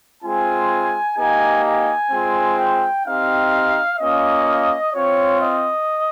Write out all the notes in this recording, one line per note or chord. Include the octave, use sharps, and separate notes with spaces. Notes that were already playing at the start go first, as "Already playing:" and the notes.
G#3 C4 F4 G#5
A#3 D#4 G4 G#5
G#5
G#3 C4 F4
G5
C4 D#4 G4 F5
A#3 C#4 F4 D#5
C4 F4 C#5
D#5